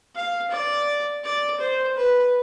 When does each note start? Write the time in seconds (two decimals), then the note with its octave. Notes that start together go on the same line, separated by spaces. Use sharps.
0.16 F5
0.51 D5
1.24 D5
1.60 C5
1.97 B4